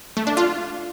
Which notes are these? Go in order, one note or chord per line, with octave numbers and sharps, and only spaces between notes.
A3
D4
F4